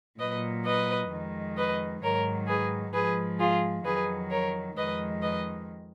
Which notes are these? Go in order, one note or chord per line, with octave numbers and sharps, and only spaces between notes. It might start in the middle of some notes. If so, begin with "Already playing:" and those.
A#2 F#3 B4 D#5
B4 D#5
F2 D#3 G#3
B4 D#5
G#2 D#3 F#3 A#4 C#5
G#4 B4
G#2 F3 G#3 G#4 B4
F4 G#4
F2 D#3 F#3 G#4 B4
A#4 C#5
F2 D#3 G#3 B4 D#5
B4 D#5